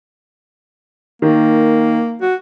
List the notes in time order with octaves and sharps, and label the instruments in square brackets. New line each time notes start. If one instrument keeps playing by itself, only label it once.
[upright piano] D#3 [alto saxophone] A#3
[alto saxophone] F#4